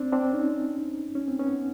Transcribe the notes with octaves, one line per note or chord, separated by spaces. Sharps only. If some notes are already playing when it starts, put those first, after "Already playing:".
Already playing: C4 D4
C4 D4
C#4 D#4
C#4
C4
B3 C#4